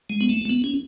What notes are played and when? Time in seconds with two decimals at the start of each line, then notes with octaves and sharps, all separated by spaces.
0.10 G#3
0.21 B3
0.29 A3
0.45 A3
0.50 B3
0.64 C#4